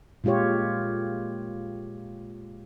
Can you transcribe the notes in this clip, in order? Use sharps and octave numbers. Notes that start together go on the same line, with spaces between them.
A#2 G#3 F4 G4 C#5